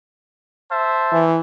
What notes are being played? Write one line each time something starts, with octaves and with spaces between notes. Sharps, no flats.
C5 E5 A5
E3